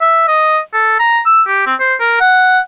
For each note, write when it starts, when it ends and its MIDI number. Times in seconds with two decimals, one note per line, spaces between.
0.01 0.24 76
0.28 0.59 75
0.74 0.97 69
0.99 1.20 82
1.26 1.42 88
1.48 1.66 67
1.67 1.75 60
1.80 1.95 72
2.00 2.20 70
2.21 2.59 78